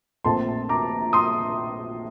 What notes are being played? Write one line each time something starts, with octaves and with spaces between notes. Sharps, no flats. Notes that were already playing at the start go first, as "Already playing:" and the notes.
A#1 A#2 A3 C4 A5 C6
A#5 D6
C6 D#6